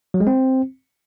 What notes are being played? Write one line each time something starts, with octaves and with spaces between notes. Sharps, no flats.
F#3
G#3
C4